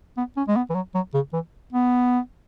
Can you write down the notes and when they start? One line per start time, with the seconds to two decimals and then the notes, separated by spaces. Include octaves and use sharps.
0.17 B3
0.37 C#4
0.48 G#3
0.56 B3
0.70 E3
0.75 F#3
0.95 F#3
1.14 C#3
1.33 E3
1.73 B3